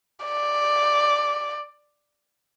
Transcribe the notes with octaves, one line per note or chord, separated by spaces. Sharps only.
D5